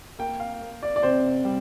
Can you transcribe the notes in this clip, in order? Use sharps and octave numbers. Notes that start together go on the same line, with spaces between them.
A#3 G5
F5
A#3
D5
D5
C3 C5
G3